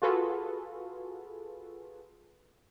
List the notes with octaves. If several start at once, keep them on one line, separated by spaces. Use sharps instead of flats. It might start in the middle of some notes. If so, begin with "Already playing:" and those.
F4 F#4 G#4 A4 B4